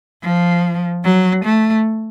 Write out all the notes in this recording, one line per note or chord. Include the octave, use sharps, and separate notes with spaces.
F3
F#3
A3